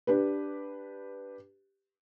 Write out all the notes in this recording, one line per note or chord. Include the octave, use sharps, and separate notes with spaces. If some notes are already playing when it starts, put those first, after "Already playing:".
D4 G4 B4